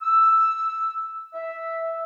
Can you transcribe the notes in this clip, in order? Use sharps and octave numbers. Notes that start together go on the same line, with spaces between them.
E6
E5